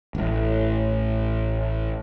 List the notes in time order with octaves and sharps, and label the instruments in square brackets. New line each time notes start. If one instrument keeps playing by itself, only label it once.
[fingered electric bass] A1 A2